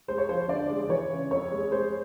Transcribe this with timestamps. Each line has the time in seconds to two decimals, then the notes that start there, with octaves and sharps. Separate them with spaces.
0.08 G#3 C5
0.18 C#5
0.29 F3 C5
0.48 D3 D5
0.70 G#3
0.89 E3 C#5
1.11 C#3
1.31 F2 C#5
1.51 G#3
1.71 G#3 C5